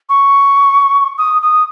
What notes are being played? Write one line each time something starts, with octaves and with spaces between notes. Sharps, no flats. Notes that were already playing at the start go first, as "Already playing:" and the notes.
C#6
D#6
D#6